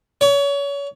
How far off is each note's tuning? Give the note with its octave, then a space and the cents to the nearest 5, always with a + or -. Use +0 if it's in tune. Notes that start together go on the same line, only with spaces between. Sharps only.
C#5 +30